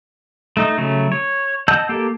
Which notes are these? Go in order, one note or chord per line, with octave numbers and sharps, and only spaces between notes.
A3 D#4 D#5
C#3 F#3 A3
C#5
D#5 F#5 A5 E6 G6
A#3 G4 A4